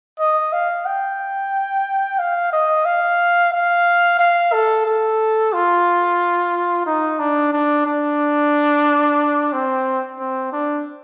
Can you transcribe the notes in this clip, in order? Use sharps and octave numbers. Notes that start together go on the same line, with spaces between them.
D#5
F5
G5
F5
D#5
F5
F5
F5
A4
A4
F4
D#4
D4
D4
D4
C4
C4
D4